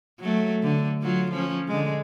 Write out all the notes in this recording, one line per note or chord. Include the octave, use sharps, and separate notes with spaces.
F#3 A3
D3
F#3 F4
F3 C#4
D3 G#3